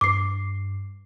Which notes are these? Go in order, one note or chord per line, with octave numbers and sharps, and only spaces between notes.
G2 D6 C7